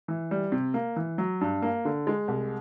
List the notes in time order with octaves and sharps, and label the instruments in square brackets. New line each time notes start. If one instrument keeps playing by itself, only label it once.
[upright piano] E3
G3
C3
A#3
E3
F#3
G2
A#3
D3
G#3
C2